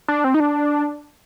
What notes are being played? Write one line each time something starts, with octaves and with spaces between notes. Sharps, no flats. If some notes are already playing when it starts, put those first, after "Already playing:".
D4
C4
D#4
D4